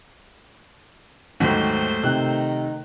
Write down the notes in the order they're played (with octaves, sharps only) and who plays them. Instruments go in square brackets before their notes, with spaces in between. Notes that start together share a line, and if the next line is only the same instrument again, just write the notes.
[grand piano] D#2 G#2 F#3 [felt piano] D#3 [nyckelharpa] A3 C5
[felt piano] C3 [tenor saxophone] D#3 [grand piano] F#6